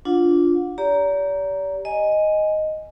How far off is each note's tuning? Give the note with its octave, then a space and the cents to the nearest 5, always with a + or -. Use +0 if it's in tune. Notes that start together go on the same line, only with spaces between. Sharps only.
D4 -10 F4 -5 F#5 -30
G4 +0 D5 -45 A#5 +0
D#5 +0 G#5 +0